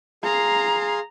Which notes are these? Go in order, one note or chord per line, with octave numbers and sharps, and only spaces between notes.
G#4 F5 A#5 C6